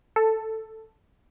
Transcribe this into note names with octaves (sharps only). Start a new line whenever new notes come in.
A4